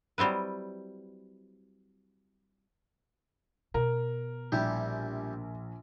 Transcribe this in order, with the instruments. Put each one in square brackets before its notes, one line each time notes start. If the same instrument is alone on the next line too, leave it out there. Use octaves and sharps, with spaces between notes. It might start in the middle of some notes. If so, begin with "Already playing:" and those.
[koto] F#3 G3 C4 E4 B4
[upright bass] B2 [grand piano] A#4
[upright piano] A#1 [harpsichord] G3 E4 G4